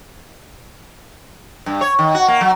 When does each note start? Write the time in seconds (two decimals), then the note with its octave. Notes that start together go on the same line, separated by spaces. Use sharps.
1.66 G2
1.81 C#5
1.99 D#3
2.15 F#4
2.28 A#3
2.41 F#3